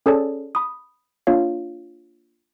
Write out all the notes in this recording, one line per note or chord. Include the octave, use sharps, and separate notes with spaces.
C#4 G#4 A4 C#5 D5 A5
B5 D#6
A#3 D4 F4 C#5 F5